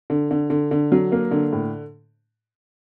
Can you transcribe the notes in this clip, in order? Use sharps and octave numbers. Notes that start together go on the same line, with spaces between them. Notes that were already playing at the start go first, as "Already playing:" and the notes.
D3
D3
D3
D3
F#3
A#3
D3
A2